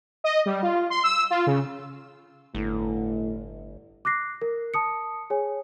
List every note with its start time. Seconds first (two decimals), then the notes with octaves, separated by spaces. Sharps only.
0.24 D#5
0.46 G3
0.62 F4
0.90 C6
1.04 E6
1.30 F4
1.47 C#3
2.55 G1 A2
4.05 D6 F#6 A#6 C7
4.42 A#4
4.74 A5 D#6 C#7
5.30 G#4 C#5 G#5